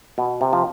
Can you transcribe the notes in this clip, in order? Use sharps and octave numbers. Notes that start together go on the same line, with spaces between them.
B2
C3
F3